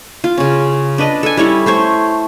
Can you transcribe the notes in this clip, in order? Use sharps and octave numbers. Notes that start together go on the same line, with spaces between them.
F4
C#3 C#4
D4 B4 D#5 A5
A4 G#5
G3 C#4 E4 C#5
A3 C5 C#5